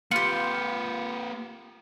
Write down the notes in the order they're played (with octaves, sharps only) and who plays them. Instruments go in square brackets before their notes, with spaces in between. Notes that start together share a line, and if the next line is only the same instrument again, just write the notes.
[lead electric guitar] A#3 B4 [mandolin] F4 G4 [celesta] C#7